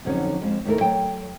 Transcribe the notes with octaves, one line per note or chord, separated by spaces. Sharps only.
F2 D3 F#3 C4 C#4 D#4
F2 G#3
D#2 A3 E4 A4 A#4
F#3 G5